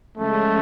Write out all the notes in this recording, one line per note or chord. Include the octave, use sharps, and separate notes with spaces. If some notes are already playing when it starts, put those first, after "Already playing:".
C#3 F3 G#3 A3 C#4